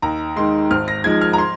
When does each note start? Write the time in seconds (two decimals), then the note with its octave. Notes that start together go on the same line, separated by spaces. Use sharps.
0.02 D#2 A#5
0.36 D#3 G#3 C6
0.71 G#1 F6
0.88 A#6
1.04 G#2 F3 G#3 G#6
1.21 F6
1.33 A#5
1.38 C6